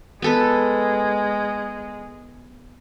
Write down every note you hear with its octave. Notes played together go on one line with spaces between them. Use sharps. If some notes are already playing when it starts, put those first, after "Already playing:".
G#3 B3 A4 B4